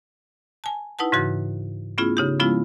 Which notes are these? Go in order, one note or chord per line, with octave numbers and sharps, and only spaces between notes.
G#5 A5
D#4 E4 B4 F#5 A5
G#2 C#3 E3 F#4 A6
A3 B3 C#4 E4 F4 G#4
C#3 D#4 G4
F3 G#3 B3 C#4 E4 F4